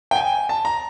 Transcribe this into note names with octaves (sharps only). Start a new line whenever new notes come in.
G5
G#5
A5
A#5